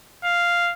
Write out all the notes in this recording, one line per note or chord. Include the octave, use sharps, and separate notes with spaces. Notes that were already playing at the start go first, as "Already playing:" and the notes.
F5